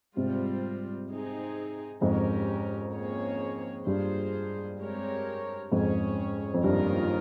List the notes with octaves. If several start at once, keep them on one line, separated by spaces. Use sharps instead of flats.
G#2 C3 G3 C4 F4
C4 D#4 G#4
F2 G#2 C#4 G4 A#4
A#3 C#4 G#4 C#5
G2 A#3 F4 G#4 C5
G#3 C4 G4 A#4 C#5
F2 G#2 C#4 G#4 C#5
F2
G2 D#3 A#3 C#4 F4 A#4